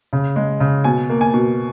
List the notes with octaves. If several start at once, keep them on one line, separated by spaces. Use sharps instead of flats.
C#3
G#3
C#3
B2 G#5
A#3
G#5
B2